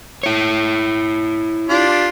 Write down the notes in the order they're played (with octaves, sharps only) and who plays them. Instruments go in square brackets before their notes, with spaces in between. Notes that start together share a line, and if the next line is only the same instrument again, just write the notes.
[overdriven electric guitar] E4 C#5
[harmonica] D4 F4 G4